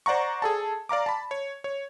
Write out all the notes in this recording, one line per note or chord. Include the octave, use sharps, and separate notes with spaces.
C5 D5 F#5 A#5 C#6
G#4 A4 A5
D5 F5 A#5 D6
A5 B5
C#5
C#5